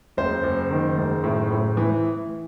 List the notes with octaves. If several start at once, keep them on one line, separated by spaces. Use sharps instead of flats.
F#1 C5
F#1
D#3
F#1
A2
A2
E3